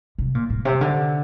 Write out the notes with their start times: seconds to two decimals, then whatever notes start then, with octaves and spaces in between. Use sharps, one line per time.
0.18 C3
0.35 A#2
0.50 A2
0.65 C3
0.81 D3